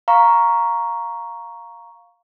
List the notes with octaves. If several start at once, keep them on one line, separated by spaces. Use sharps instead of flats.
F5 A#5 C#6